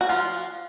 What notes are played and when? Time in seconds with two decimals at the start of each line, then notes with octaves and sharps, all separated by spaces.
0.01 F#4
0.09 F3 F4